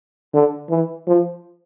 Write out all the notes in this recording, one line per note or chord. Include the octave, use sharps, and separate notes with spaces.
D3
E3
F3